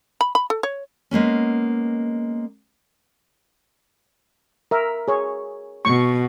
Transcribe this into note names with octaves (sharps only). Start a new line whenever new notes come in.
B5
B5
A4
C#5
G#3 A#3 B3 C#4
A#4 E5
G#4 C#5
B2 C#6